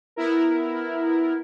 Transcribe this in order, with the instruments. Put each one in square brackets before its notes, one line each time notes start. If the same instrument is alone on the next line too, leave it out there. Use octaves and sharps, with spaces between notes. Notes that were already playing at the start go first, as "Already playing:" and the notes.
[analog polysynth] B3 E4 A#4